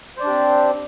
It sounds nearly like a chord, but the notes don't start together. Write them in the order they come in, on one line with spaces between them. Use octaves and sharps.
C5 D5 D4 G4 C4